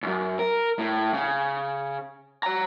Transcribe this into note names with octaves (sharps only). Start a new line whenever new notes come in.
C#2 F#2
A#4
A2
C#3
C#5 A#5